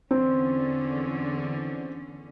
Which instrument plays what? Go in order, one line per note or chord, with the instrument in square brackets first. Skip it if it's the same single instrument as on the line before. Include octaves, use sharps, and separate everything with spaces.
[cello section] E2 D3 C#4 [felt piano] C4